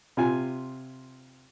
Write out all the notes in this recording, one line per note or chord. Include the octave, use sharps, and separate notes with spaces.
C3 F4 G#5